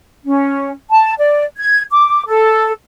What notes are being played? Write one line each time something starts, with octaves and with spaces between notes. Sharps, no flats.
C#4
A5
D5
G#6
D6
A4